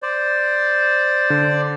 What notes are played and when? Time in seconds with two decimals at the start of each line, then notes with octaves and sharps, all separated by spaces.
0.02 C5 D5
1.30 D3